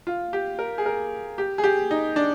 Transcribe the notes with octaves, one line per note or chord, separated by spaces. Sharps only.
F4
G4
A#4
G#4
A#4
G4
G#4
G4
D#4
D4